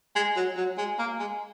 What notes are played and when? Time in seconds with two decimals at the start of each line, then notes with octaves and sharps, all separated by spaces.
0.16 G#3
0.36 F#3
0.57 F#3
0.78 G#3
0.99 A#3
1.20 G#3